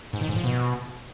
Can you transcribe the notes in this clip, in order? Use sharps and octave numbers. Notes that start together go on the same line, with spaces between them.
G#2
D#3
G#2
F3
B2